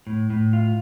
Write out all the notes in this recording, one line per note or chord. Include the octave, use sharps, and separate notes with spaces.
A2
A2
F4